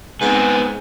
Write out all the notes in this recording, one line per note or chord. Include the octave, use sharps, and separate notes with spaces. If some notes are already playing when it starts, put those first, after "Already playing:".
G#2 B3 C4 G#5